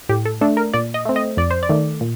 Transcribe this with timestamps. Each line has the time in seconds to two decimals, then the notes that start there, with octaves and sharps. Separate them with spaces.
0.09 A2 G4
0.25 A4
0.41 A3 D4 A4
0.57 A#4
0.73 A#2 D5
0.94 D#5
1.05 A3 C4
1.16 D#5
1.37 F2 D5
1.51 C5
1.63 D5
1.69 D#3 A3
2.01 A#2